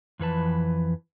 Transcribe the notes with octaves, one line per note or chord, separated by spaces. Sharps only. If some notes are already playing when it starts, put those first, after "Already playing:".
F2 E3 B4 A5